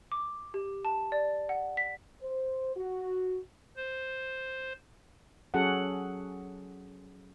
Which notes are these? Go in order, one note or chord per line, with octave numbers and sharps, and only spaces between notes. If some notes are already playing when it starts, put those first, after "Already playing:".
D6
G4
A5
D5
F#5
B6
C5
F#4
C5
F#3 C#4 F#4 G#4 A4 F#5